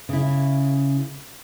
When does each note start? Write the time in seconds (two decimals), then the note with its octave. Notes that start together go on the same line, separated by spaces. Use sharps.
0.09 C#3 E4